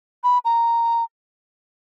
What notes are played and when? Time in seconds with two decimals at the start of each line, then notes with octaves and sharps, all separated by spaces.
0.24 B5
0.45 A#5